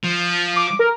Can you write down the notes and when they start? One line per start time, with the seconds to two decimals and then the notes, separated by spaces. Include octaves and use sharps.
0.04 F3
0.56 D6
0.79 A#4